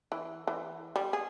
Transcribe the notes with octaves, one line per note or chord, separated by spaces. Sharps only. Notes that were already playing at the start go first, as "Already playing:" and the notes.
E3
E3
G3
G#4